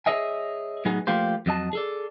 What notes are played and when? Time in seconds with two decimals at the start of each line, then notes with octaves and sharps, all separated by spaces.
0.06 G#4 A#4 C#5 D#5 E5 G#5
0.85 A2 F#3 B3 D#4 G#4
1.07 F3 A3 A#3 F4 G4 C5
1.46 F2 F#3 D#5 A5
1.73 G#4 A4 D5